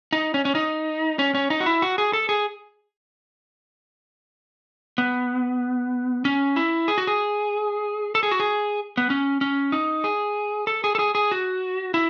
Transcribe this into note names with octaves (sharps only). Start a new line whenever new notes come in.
D#4
C#4
C#4
D#4
C#4
C#4
D#4
F#4
E4
F#4
G#4
A4
G#4
B3
C#4
E4
G#4
F#4
G#4
A4
G#4
F#4
G#4
B3
C#4
C#4
D#4
G#4
A4
G#4
A4
G#4
G#4
F#4
E4